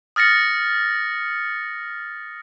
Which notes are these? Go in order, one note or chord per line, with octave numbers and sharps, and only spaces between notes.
D#6 F6 A6 A#6 C#7